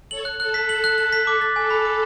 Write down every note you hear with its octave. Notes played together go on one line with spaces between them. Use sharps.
A4 C#5 F#7
F#6
A4 F#6
B6
F#7
F#6
F#6
B6
A4 D6
A6
A4 G#5
B5
D6